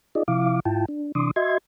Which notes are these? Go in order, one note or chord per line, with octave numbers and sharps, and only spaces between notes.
D#4 F4 G#4 D5 D#5
C3 F3 E4 F5 D6
G#2 E4 F4 G5 A5
D4
C3 E3 D4 C6 D6 D#6
F#4 D#5 E5 C6 G#6